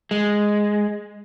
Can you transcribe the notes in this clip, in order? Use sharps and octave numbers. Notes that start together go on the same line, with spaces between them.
G#3